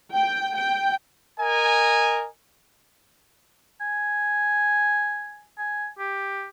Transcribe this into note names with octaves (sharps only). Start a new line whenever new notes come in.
G5
G5
A#4 D#5 G#5
G#5
G#5
G4